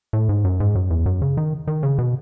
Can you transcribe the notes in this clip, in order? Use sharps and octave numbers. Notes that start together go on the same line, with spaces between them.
A2
G#2
F#2
G#2
F#2
E2
F#2
C#3
D#3
D#3
C#3
B2